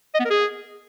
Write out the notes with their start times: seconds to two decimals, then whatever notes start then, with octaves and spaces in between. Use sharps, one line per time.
0.15 D#5
0.20 B3
0.25 A#4
0.30 G#4